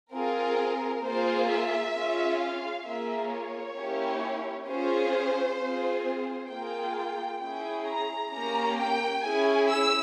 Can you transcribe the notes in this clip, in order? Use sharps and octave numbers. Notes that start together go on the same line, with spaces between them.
C4 F4 G#4 A#4
A#3 F4 G#4 C5
E5
C#4 F4 G#4
F5
A#3 F4 G#4 E5
C#5
A#3 C#4 E4 G4
C#4 F4 G#4 C5
C4 F4 G#4
C5
A#3 F4 G#4 G5
C#4 E4 G#4 G5
A#5
A#3 C#4 G4 A#5
G5
C#4 E4 G#4 G#5
E6